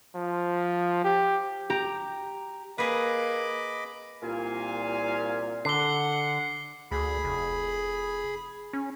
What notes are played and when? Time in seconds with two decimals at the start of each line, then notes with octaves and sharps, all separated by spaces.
0.15 F3
1.04 G4
1.70 G4 A#5
2.78 A#3 G#4 B4 D#5 B5 D6
4.22 C2 A#2 F5 G#5
5.65 D3 F#5 C7 G7
6.91 D2 G#4 B5
7.24 F1
8.73 C#4